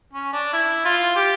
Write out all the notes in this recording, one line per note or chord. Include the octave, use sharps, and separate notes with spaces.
C#4
D4
E4
F4
G4